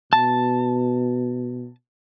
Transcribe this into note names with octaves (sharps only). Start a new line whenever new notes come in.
B2 A5